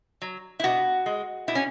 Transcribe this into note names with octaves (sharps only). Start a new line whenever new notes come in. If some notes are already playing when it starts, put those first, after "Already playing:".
F#3
E4
B2 F#4
G#3
B2 E4
C#4